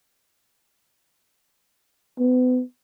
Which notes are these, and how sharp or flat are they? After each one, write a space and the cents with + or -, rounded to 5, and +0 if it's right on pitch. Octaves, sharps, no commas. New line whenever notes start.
B3 +35